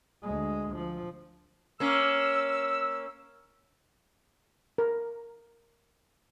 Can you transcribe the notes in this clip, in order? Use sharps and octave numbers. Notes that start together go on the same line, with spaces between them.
D2 G#3
F3
A#3 C#4 E6
A#4